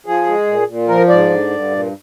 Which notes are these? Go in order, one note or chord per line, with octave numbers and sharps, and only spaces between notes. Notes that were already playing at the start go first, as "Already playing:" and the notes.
F3 G#4
G#3
A#2
A#2
F3 A#4
G#2 D5
D3
G2
A#2